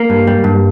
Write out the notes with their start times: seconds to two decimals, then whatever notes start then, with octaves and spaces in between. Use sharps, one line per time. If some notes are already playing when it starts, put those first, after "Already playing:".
Already playing: A#3
0.10 G2
0.27 G3
0.44 G2